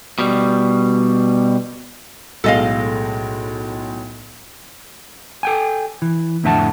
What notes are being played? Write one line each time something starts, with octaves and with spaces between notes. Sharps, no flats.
B2 G3
B1 A2 G#3 A4 D#5 F5
A4 G5 G#5
E3
F2 A2 D3 E5 F#5 A5